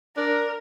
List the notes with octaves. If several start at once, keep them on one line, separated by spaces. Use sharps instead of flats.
D4 A#4